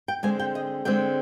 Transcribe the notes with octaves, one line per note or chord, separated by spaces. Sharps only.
G5
D3 G#3 C4 G#5
G5
D#5
D3 G#3 C4 G5